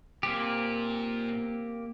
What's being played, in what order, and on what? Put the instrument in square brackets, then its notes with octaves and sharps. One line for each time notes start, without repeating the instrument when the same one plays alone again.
[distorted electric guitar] A#2 [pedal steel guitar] A#3 C4 G4